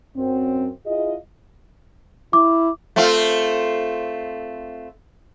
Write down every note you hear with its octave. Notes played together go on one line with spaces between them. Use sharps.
F#2 C4
E4 F4 G#4 D#5
E4 D6
A3 C4 F4